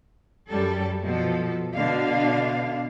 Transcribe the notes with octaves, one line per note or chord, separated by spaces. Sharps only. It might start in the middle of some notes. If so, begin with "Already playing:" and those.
F#2 G3 A4
B2 F3 A4
B2 D3 D4 F5